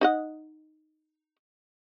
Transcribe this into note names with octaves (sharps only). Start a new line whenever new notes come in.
D#4 D#5 F#5